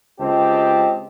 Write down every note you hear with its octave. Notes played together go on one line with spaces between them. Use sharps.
C#2 C4 G4 D#5 A5